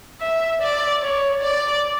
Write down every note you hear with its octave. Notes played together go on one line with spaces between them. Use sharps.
E5
D5
C#5
D5